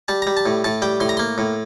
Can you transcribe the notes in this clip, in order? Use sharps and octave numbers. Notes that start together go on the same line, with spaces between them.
G3 A5
G3 A#5
A5
A2
A2 A5
G3 G5
A2 C6
A#5
A#3 C6
A2